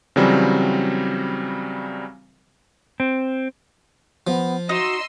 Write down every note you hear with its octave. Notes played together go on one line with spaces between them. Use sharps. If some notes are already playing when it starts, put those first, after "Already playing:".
C#3 E3 F#3 G3 C4
C4
F3 B3
D#4 F#4 D#5 C6 E6